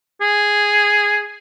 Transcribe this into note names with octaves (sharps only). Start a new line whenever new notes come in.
G#4